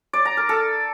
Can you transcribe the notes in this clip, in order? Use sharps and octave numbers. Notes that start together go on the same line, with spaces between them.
D5
A#5
A#4
A4